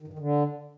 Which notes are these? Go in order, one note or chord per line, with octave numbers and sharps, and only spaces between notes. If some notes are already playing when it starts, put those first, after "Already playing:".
D#3
G2
D#3
D3